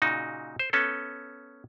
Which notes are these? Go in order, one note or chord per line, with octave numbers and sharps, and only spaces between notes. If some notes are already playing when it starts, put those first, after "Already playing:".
A#2 C#3 D#4 F#4
C5
B3 C#4 A4